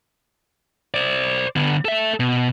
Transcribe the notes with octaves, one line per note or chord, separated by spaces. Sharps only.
C5 D5
D3 B3
A4 E5
B2